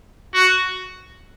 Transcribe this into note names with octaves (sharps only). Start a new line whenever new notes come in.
F#4